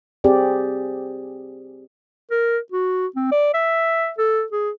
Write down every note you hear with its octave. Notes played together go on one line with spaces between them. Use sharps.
C4 G4 G#4 D5
A#4
F#4
C4
D5
E5
A4
G#4